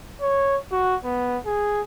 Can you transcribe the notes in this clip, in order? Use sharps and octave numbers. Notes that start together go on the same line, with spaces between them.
C#5
F#4
B3
G#4